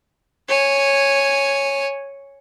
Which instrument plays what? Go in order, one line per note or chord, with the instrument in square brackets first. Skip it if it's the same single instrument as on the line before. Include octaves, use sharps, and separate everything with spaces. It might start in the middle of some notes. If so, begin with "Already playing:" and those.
[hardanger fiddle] C#5 G#5